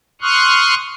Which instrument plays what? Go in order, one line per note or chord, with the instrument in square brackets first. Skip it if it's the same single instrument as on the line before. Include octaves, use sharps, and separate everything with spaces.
[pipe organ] C6 C#6 D#6 F6 F#6